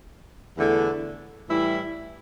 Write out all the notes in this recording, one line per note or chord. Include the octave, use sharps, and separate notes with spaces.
E2 D3 A3 E4 A4
A2 E3 G3 E4